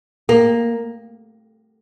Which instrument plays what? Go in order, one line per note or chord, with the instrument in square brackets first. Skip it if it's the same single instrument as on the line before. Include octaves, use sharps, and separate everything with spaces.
[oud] A#3